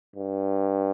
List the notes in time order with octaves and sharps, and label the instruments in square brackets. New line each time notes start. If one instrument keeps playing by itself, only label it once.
[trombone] G2